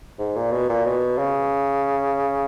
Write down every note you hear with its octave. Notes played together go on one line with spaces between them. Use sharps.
G#2
A#2
B2
A#2
B2
C#3